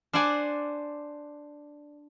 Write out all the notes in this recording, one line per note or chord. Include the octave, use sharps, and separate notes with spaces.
D4 C5 D5 F#5 G#5